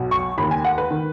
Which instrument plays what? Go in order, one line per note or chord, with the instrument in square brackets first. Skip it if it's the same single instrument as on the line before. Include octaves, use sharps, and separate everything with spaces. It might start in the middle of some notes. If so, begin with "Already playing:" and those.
Already playing: [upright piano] B1 B2
C#6
D#2 B5
D#3
G#5
F#5
B4
D#3